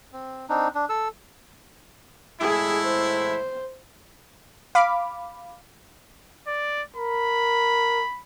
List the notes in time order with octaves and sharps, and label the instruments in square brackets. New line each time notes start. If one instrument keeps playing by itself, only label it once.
[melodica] C4
C4 D4 D#4
D4
A4 E6
[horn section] A2 G#3 E4 [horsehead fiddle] G#4
[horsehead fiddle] C5
[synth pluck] F5 B5 D6
[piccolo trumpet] D5
[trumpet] A#4 [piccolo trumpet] B5